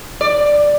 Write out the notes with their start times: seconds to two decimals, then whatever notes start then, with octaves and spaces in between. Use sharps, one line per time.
0.21 D5